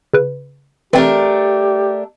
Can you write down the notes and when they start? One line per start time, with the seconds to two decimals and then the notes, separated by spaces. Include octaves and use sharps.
0.14 C#3 B4
0.93 E3 A3 C4 D4 G4 A#4